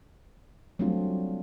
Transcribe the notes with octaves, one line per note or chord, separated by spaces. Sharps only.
F#3 G3 A3 C4 D4 F4